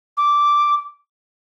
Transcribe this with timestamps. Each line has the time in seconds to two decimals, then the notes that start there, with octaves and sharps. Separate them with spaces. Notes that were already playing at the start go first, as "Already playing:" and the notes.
0.17 D6